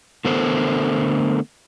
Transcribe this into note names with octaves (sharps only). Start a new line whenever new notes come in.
D3 A3 B3 A4 A#4 C5